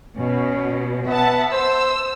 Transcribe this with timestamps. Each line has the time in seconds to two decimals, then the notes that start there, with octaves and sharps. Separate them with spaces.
0.17 B2 C#4
1.08 B3 E5 F#5 A5
1.53 C5 E6